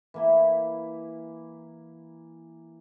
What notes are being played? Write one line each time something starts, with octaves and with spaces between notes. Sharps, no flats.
E3 A#3 E4